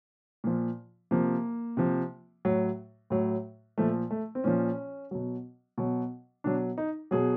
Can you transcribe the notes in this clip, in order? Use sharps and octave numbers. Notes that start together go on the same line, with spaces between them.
A#2 F3
C3 F3 A#3
C3 F3
A2 F#3
A2 F#3
A#2 F3 A3
A3
C4
A#2 F3 C#4
B2 F#3
B2 F#3
B2 F#3 D4
D#4
B2 F#3 G#4